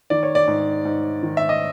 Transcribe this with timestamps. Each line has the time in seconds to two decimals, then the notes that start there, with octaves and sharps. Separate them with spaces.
0.10 D#3 D5
0.23 C#5
0.35 D5
0.48 G#2
0.85 G#2
1.23 D#3
1.37 E5
1.49 D#5